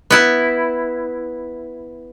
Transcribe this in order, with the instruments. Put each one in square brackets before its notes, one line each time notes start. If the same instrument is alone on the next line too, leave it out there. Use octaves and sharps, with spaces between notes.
[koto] B3 E4